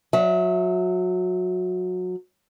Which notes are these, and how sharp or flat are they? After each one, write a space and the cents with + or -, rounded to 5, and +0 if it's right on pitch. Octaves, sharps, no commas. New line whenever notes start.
F#3 -25 E5 -10